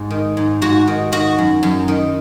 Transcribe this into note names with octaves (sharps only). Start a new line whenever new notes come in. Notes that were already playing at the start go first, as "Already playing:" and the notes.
Already playing: G#2
D#3
G#2
G#2 F#4
D#3
D#3 F#4
F#2
F#2
D#3